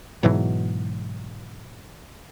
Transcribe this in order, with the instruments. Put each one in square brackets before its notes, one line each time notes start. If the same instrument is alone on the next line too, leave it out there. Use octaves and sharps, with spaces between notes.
[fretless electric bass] G#2 B2 E3 F#3